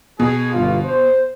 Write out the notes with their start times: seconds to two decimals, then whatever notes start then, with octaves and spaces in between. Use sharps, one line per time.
0.20 B2 G#4
0.53 G1 F4
0.84 C5